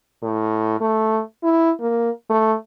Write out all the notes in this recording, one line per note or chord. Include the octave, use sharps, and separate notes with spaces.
A2
A3
E4
A#3
A3